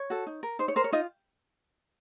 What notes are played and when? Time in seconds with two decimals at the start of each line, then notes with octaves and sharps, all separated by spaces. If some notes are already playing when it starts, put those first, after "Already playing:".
Already playing: C#5
0.10 F#4 A4
0.27 D#4
0.43 A#4
0.59 D#4 C5
0.68 C#5
0.76 A#4 C5
0.84 C#5
0.92 D#4 F4 D#5